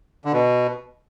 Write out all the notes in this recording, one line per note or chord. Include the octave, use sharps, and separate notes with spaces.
D3
B2